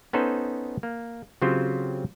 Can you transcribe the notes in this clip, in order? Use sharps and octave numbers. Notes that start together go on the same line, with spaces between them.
B3 C#4 D#4 A4 C5
A#3
C#3 F#3 C4 F4 G4 C5